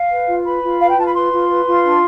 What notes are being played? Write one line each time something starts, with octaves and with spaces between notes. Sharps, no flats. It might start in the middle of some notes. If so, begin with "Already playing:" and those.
Already playing: F5
B4
F4
B4 B5
F4
B4 F5
G5
F4 A5
B5
B4 C6
F4
B4
F4
D4